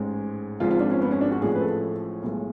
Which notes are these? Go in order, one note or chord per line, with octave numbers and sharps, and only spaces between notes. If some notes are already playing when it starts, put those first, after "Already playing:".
Already playing: A1 G#2 G#3
G#1 G#2 F3 F4
F4
D4
C#4
B3
C#4
D4
F#4
A1 A2 F3 G#3 G#4
B4
A4
B1 A2 G#3